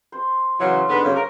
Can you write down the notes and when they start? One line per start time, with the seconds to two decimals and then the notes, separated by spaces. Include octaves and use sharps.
0.12 C5
0.60 C#3 E3 F#3 C6
0.89 G#2 D3 B3
1.04 F#2 C#3
1.16 A#4